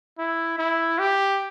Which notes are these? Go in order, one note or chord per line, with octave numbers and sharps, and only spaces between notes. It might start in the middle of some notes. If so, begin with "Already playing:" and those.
E4
E4
G4